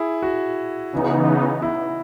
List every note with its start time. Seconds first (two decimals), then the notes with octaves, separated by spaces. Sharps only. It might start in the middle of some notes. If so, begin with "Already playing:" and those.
Already playing: E4 G#4
0.22 F#4
0.93 C#3 E3 B3 D#4
1.62 E4